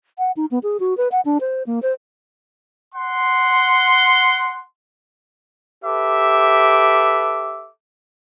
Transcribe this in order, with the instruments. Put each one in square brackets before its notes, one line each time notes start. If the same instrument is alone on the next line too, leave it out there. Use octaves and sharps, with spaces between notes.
[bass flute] F#5
D#4
B3
G#4
F#4
B4
F#5
D4
C5
A#3
C5
[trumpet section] F#5 C6
G4 A4 B4 E5 D6